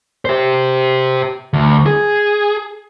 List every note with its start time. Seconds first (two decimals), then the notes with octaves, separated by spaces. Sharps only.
0.25 G4 C5
1.53 D2
1.86 G#4